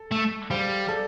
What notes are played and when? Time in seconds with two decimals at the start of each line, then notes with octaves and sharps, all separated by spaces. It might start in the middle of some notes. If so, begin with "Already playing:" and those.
Already playing: A4
0.12 A3
0.50 G3 C5 F5
0.88 A4 D5